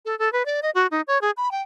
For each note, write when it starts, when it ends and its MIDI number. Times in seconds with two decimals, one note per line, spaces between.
0.05 0.17 69
0.19 0.31 69
0.33 0.45 71
0.45 0.60 74
0.62 0.70 75
0.75 0.87 66
0.91 1.01 63
1.08 1.21 73
1.21 1.31 68
1.37 1.51 83
1.51 1.62 79